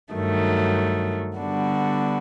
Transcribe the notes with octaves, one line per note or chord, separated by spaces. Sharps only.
G2 D#3 F#3 A3
D3 G3 B3 D4 F#4